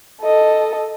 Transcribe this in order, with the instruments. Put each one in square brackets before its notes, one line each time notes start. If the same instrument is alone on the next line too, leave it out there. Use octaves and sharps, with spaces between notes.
[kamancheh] A4 D#5